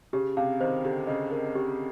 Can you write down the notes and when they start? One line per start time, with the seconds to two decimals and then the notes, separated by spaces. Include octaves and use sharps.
0.13 C#3 G4
0.37 C3 F5
0.61 D#3 C5
0.84 D3 G4
1.07 C#3 D#5
1.31 A#4
1.55 G4